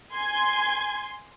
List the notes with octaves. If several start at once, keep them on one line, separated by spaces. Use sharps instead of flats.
G#5 C6 G#6